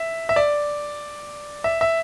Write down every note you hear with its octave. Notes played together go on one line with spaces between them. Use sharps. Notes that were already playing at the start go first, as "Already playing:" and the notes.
Already playing: E5
E5
D5
E5
E5